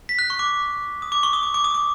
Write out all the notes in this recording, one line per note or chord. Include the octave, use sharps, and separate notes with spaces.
B6
F#6
C#6
D6
D#6
D6
C#6
D#6
D6
D6
D#6
D6